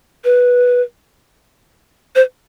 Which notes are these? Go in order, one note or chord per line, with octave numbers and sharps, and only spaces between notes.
B4
C5